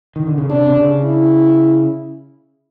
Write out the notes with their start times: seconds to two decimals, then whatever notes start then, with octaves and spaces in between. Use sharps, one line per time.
0.16 D#3
0.27 D3
0.38 C#3
0.50 C3 D4
0.66 C3
0.77 C#3
1.03 E4